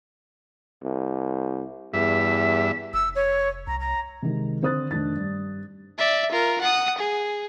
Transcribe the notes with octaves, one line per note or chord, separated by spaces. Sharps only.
C2
E2 G2 E5 B6
F1 E6
C#5
C2 A#5
A#5
C3 D#3 G#3
D3 C4 C5 D#6 F#6 A6
F1 D#3 D4 A6
G2
D5 E5
F4 A#4
F#5 D#6
G#4